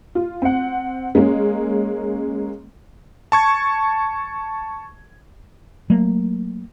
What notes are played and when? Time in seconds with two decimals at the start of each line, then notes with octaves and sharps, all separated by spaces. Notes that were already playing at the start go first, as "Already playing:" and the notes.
0.15 F4
0.42 C4 F#5
1.15 G#3 A#3 C#4
3.32 A5 C#6 G#6
5.90 F#3 A3 A#3